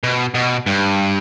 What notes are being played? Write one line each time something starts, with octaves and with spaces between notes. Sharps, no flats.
B2
B2
G2